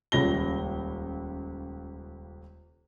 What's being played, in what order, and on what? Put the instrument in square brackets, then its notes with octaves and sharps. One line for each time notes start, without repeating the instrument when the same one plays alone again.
[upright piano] D#1 C#2 A#6 G7